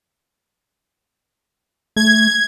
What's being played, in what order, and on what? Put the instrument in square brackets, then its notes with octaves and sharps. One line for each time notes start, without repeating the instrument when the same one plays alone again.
[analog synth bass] A3 [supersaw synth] G#6